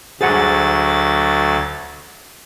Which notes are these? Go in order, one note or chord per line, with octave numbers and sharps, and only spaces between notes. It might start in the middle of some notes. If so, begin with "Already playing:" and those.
D2 F#3 G#4 C5 F#5 A6